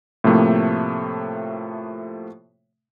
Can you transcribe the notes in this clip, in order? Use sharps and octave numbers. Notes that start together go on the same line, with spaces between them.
A2 C3 F3 A3 A#3